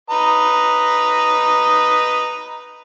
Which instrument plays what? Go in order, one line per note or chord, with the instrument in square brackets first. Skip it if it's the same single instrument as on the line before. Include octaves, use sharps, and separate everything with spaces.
[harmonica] B4 D#5 A#5